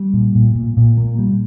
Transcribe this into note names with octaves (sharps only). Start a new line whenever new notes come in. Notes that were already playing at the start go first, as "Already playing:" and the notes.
Already playing: G3
A#2
A#2
A#2
A#2
A#3
G3